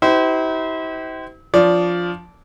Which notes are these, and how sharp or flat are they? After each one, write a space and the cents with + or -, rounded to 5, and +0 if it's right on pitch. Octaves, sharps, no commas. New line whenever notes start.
E4 -40 G4 -40 C5 -30
F3 +0 D4 -25 D5 -20